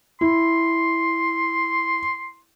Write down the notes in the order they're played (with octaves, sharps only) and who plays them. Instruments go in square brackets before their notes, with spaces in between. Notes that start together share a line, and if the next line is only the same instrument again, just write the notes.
[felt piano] E4 [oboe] C6